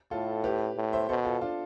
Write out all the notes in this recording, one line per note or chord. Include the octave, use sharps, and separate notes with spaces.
A2 F4 A4
G4 B4
A2
C5 E5
B2 A4 C5
F4 A4
D4 F4